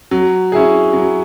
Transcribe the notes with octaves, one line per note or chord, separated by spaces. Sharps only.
F#3
C#4 E4 G#4
F#3